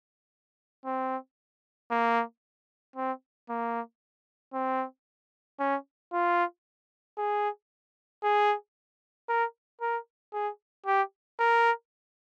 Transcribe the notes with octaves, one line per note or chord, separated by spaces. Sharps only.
C4
A#3
C4
A#3
C4
C#4
F4
G#4
G#4
A#4
A#4
G#4
G4
A#4